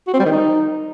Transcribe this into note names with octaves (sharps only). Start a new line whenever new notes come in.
F#4
C4
G3
D#3
D#4